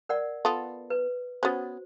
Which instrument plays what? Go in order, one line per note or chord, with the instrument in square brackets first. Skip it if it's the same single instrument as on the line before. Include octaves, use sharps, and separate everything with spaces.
[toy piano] A#4 D5 F#5
[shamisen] B3 F4 A4
[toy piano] B4
[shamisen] B3 C#4 [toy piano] F#4 C5